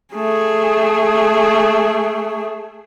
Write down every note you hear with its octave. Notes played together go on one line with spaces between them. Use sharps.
A3 G#4